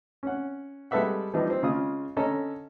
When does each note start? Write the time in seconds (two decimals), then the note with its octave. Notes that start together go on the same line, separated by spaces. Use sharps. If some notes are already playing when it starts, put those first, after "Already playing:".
0.23 C#4 F#5
0.91 G3 G#3 A4 B4 E5 F#5
1.34 E3 F3 G3 D4 D#4
1.50 C4
1.63 C#3 G#3 F4 D#6
2.17 D3 C#4 A4 D#5 A#5